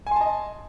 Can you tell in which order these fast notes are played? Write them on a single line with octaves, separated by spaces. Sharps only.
G#5 C6 A5 D#5